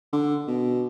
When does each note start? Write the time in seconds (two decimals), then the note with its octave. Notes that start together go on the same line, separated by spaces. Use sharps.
0.13 D3
0.48 B2